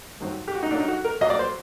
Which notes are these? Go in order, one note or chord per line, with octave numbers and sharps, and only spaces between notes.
G2 D#3 F#3 C4
G4
F#4
D#4
A#2 F#3 A#3 D4
D#4
F#4
A#4
A#2 F#3 A#3 D#5
D5
C5